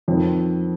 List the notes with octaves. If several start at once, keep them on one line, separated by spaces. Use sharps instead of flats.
F2 D#3 C4